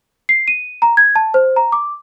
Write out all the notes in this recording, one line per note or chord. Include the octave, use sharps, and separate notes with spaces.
C7
D#7
A#5
G#6
A5
C5
A#5
D6